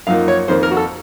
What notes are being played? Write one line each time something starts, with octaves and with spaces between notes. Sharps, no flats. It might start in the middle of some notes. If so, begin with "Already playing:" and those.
F#2 F3 A#3 D#4 F5
C#5
F2 D#3 A#3 C5
A#4
F#4
A4